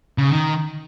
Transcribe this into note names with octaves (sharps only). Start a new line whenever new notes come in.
C#3
D#3